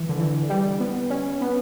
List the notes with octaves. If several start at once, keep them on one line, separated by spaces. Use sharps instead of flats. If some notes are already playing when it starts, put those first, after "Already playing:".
Already playing: E3
D3
E3
G3
B3
C#4
B3